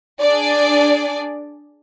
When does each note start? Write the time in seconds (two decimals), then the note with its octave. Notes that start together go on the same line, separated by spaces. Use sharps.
0.20 D4 G#4 D5